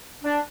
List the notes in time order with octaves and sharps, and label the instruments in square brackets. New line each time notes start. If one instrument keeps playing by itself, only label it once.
[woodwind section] D4